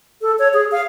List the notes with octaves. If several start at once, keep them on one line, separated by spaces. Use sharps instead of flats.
A4
C#5
G#4
F5